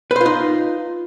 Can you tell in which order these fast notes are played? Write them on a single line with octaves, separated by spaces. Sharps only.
B4 C5 F4 D#4